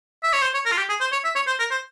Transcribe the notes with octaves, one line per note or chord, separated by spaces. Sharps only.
E5
C#5
C5
C#5
A#4
F4
G4
G#4
C5
C#5
E5
C#5
C5
A#4
C5